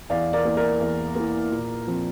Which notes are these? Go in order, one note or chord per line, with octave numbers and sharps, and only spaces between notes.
E2 D5 F5
A#4 D5
E3 A#3
A#4 D5
E2
E3 A#3
A#2
F3 C4